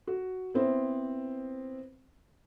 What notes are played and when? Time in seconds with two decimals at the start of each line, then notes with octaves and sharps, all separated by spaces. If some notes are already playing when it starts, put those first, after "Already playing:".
0.07 F#4
0.54 B3 C4 E4 C5